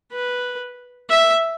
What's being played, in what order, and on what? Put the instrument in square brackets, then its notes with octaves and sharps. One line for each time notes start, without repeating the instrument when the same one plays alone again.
[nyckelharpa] B4
E5